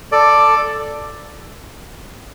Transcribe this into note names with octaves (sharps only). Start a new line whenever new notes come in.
A4 D5